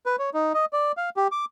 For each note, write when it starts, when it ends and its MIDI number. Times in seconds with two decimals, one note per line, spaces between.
0.06 0.16 71
0.19 0.30 73
0.34 0.53 63
0.54 0.65 75
0.73 0.92 74
0.97 1.10 77
1.17 1.28 67
1.32 1.45 86